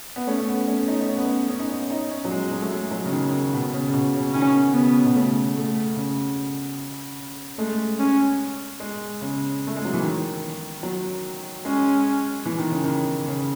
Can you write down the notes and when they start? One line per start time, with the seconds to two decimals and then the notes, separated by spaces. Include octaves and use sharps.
0.16 B3
0.27 A3 C#4
0.39 C#4
0.48 B3
0.68 A3 C#4
0.88 D#4
1.08 C#4
1.17 B3
1.26 C#4
1.49 C#4
1.59 D#4
1.68 C#4
1.90 D#4
2.10 C#4
2.25 F#3
2.31 G#3
2.51 F#3
2.62 A3
2.71 G#3
2.91 F#3
3.05 C#3
3.12 D#3
3.32 C#3
3.53 B2
3.73 C#3
3.89 C#3
3.93 B2
4.13 C#3
4.33 D#3 C#4
4.74 C#3 B3
5.05 B2
5.14 C#3 A3
5.56 A3
5.96 C#3
7.58 G#3 A3
8.00 C#4
8.80 G#3
9.21 C#3
9.67 A3
9.76 G#3
9.85 F#3
9.94 E3
10.02 D#3
10.83 F#3
11.65 G#3 C#4
12.46 E3
12.58 D#3
12.71 C#3
12.83 D#3
13.27 C#3